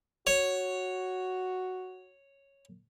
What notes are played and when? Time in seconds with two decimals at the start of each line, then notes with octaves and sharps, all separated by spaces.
0.27 F#4 C#5